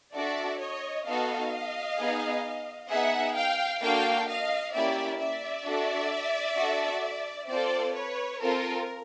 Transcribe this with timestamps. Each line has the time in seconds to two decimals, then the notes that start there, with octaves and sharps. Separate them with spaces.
0.14 D4 F#4 A4 D5 E5
0.60 C#5 D#5
1.05 B3 D#4 F#4 A4 D#5 F5
1.98 B3 D#4 G#4
2.89 B3 D#4 G#4 E5 F#5
3.35 F5 G5
3.81 A#3 D4 F#4 A4 F5 G5
4.27 D#5 F5
4.73 A#3 C#4 E4 G4 D5 E5
5.19 D5 E5
5.65 D4 F#4 A4
6.56 D4 F#4 A4
7.48 C4 F4 A4 C5 D5
7.94 B4 C#5
8.40 C4 F4 A4 A#4